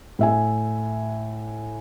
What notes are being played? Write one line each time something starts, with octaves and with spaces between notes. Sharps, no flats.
A2 E5 G#5